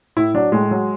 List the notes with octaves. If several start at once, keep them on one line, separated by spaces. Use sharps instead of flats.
A2 E4
F#3 D4
A2 G#3
F#3